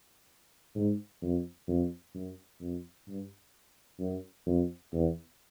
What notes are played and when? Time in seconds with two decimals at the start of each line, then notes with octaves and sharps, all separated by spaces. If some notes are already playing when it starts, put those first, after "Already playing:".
0.75 G#2
1.22 F2
1.68 F2
2.14 F#2
2.60 F2
3.08 G2
4.00 F#2
4.46 F2
4.93 E2